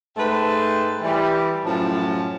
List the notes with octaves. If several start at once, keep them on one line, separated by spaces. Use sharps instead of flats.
G#2 A3 B4 G5 A5 C6
E3 G3
F#2 A2 F3 A5